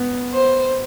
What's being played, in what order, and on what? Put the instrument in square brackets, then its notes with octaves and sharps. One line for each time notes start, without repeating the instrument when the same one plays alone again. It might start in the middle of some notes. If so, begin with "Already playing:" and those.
Already playing: [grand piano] B3
[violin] C5